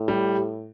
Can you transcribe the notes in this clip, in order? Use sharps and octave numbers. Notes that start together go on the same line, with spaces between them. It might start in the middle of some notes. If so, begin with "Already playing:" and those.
Already playing: A2
G3